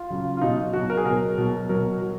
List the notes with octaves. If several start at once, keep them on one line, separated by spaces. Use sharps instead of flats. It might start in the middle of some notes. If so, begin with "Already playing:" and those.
Already playing: F4
C#3 F#3
F4
B2 F#3 D#4
B2 F#3 F#4
A#4
G#4
B2 F#3 A#4
B2 F#3
B2 F#3 A#4
F#3